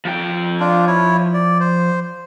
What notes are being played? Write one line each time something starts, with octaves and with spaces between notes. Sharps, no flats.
F3 G5
D4 F4
E4 C#5
D5
C5